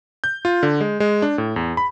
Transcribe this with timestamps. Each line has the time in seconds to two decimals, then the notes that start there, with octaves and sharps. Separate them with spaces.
0.24 G6
0.45 F4
0.63 D3
0.81 G#3
1.00 G#3
1.22 D4
1.38 A2
1.56 E2
1.77 B5